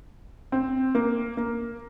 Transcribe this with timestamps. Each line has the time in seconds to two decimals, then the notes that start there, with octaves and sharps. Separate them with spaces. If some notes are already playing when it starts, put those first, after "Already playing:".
0.52 C4
0.95 A#3
1.37 A#3